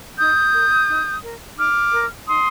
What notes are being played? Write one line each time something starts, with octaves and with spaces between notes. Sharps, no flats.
D#4 D#6 G6
A#4
D#4
A#4
D#4 D6 F6
A#4
D#4 C6 D#6